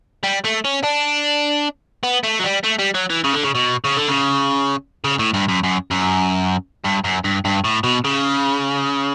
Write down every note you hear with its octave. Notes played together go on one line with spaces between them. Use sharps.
G3
A3
C#4
D4
B3
A3
F#3
G3
A3
G3
F#3
E3
C#3
D3
C#3
B2
C#3
D3
C#3
C#3
A2
G2
F#2
F#2
F#2
G2
F#2
G2
G2
A2
B2
C#3